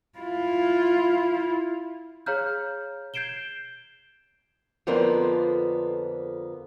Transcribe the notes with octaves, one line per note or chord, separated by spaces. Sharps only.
E4 F4
G#4 C#5 F5 A#5 F6 G6
G6 G#6 C7 D7 E7 G7
F2 D3 F3 A#3 B3